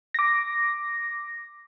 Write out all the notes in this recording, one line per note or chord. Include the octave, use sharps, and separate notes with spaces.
D6 A#6